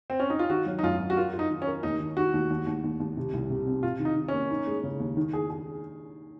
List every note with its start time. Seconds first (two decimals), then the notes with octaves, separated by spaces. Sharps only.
0.10 C4
0.20 C#4
0.30 D#4
0.39 F4
0.50 D#3 F#4
0.66 F#3
0.79 D#4
0.83 F#2 F4
1.00 F#2
1.10 F#4
1.17 F4 A#4
1.33 F4
1.39 D#4
1.50 D#3
1.62 C#4
1.67 A#4
1.83 D#2 D#4
2.00 D#3
2.17 D#3 F#4
2.34 D#2
2.50 D#2
2.67 D#2
2.84 D#2
3.00 D#2
3.17 C3
3.33 C2
3.50 C3
3.67 C4
3.83 C3 F4
4.00 D#3
4.05 D#4
4.16 D#3
4.28 A#3 C#4
4.51 D#4
4.67 G#3
4.84 C#3
5.00 D#2
5.17 D#3
5.33 G#4
5.50 G#4